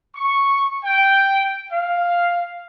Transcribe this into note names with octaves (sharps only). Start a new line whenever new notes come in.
C#6
G5
F5